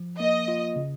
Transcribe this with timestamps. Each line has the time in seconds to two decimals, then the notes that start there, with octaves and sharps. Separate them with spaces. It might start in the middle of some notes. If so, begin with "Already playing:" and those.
Already playing: F3
0.19 A#3 D#5
0.48 F4
0.76 C#3